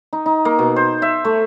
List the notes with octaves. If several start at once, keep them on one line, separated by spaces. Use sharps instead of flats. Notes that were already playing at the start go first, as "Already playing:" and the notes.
D#4
D#4
A#3
B2
C5
E5
A3